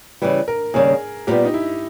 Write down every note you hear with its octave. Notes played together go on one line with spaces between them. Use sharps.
C#3 E3 G3
A#4
D#2 C#3 G3 G#4
A#2 G3 B3 G4
D#4
E4